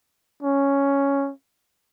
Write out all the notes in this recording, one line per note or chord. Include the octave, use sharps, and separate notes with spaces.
C#4